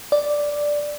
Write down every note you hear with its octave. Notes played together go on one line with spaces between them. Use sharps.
D5